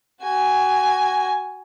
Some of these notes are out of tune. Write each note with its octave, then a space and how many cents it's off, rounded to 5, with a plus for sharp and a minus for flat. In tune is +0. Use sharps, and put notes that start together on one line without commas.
F#4 +20 G#5 +0